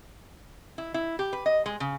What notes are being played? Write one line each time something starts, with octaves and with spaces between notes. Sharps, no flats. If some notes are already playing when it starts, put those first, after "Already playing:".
E4
E4
G4
B4
D#5
G#3
C#3